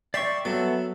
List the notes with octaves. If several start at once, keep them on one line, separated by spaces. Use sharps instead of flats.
D5 E5 G5 C6 C#6
F#3 B3 A4 E5